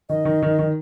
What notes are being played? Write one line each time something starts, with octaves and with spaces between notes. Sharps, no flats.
D#3 D#5
D#3
D#3
D#3